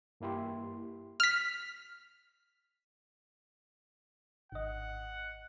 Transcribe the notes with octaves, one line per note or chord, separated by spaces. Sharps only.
G2 A#3 E4 G4 C6
F6 B6
G#1 D#5 F#5